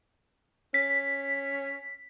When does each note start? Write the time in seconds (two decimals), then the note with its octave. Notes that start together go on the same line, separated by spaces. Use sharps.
0.74 C#4 B6